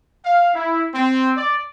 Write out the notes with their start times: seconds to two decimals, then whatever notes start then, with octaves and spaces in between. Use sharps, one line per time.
0.24 F5
0.54 E4
0.93 C4
1.36 D5